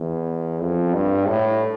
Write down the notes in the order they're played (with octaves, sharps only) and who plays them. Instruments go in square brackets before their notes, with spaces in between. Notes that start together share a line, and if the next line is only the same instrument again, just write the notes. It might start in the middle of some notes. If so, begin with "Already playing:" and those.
Already playing: [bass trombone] E2
F2
G2
A2